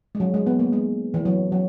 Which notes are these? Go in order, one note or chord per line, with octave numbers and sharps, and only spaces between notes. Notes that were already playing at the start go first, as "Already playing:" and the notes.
G#3
F#3
G#3
B3
A#3
G#3
E3
F#3
F#3